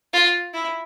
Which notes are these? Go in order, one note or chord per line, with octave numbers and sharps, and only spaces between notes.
F4
E4